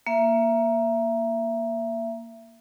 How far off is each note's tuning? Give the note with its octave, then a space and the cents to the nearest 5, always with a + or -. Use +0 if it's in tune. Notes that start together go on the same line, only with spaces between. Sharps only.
A#3 +5 E5 +20